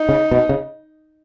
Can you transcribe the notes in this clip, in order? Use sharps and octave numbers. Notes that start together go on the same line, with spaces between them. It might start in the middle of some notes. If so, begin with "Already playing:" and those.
Already playing: D#4
C#3
B2
C#3